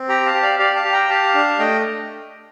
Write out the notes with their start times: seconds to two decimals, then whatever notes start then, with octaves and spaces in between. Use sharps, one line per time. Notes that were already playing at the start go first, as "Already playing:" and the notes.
Already playing: C4
0.09 G4 G5 A#5
0.26 F5 A5
0.34 G4
0.42 D5 F5
0.59 G4 D5 F5
0.76 F5 A5
0.84 G4
0.93 G5 A#5
1.09 G4 F5 A5
1.34 D4
1.59 A3 D#5 G5